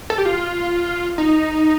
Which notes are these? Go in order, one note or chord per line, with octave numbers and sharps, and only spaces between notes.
A4
G4
F4
D#4